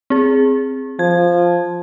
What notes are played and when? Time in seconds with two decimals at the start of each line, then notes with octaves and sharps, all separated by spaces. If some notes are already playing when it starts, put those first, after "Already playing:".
0.10 C4 G#4
0.99 F3 G#6